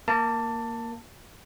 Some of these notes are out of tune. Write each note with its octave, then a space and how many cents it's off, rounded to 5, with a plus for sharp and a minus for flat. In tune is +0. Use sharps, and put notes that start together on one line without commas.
A#3 +0 A5 +20